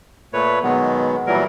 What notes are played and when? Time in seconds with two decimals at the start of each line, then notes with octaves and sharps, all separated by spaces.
0.33 A#2 A3 B4 C#5
0.63 B2 D#3 F#3 G#3 B3
1.27 A#2 E3 F#3 G3 A#4